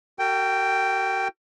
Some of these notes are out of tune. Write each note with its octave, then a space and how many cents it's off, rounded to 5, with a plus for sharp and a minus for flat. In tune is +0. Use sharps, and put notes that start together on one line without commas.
F#4 +30 A#4 -45 G5 +0